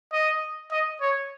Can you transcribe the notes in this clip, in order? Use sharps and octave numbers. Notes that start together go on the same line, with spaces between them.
D#5
D#5
C#5